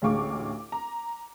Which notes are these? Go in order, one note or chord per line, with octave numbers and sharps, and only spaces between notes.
A1 D2 G#3 F5 C#6 D6
A#5